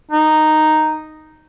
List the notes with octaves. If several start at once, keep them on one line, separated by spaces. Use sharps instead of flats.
D#4